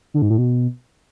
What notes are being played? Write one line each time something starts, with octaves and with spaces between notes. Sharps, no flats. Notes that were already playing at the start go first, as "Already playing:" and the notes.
D3
G#2
A2
B2